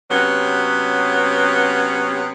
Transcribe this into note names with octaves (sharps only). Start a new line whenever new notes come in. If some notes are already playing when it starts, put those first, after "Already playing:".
C3 F#3 B3 C#4